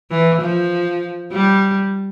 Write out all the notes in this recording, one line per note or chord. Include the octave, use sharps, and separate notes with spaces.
E3
F3
G3